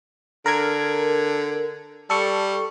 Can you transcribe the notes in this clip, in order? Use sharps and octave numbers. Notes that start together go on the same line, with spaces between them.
D3 A#4 G#6
G3 A4 C#6